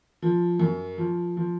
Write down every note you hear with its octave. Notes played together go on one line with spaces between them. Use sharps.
F3
F#2
F3
F3